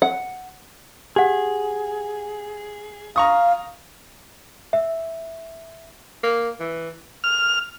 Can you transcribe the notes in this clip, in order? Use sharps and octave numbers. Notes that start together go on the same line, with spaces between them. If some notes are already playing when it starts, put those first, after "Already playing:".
F#5
G4 G#4 F#5
F5 A#5 C#6 D#6
E5
A#3
E3
F6